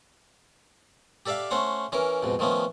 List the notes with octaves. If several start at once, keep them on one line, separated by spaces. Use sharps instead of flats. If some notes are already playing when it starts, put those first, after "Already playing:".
G4 A4 D5 E5 F5
A3 C#4 C5 F#5
E3 C#4 A#4
F2 G#2 B2
D#3 F3 A3 B3 C#4